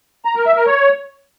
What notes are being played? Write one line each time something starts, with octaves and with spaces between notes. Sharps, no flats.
A#5
A#4
E5
A#4
C#5